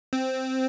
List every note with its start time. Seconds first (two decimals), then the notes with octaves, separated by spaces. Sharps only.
0.13 C4